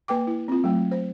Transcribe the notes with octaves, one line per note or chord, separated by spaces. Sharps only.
A#3 B4 G5 D6
E4
C4 F4
F#3 A3
C5